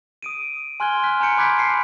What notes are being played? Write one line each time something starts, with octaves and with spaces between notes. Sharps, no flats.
D#6 D7 D#7
G#5 C6 F6 F#6 G#6 G7
F6 F#6 B6
G#5 A#5 C6 G6 C#7 D7
B5 D6 F#6 G#6 B6
A5 C7 C#7